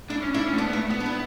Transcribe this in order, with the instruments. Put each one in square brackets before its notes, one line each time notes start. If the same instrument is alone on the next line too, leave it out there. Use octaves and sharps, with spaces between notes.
[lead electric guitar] D4 [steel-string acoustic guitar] E4
[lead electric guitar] C#4
[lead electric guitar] D4 [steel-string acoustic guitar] E4
[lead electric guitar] C#4
A3
[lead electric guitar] B3 [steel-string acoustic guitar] D4
[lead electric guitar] B3
[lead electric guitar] A3 [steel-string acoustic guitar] E4
[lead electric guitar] B3 [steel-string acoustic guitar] F#4
[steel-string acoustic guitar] D4
E4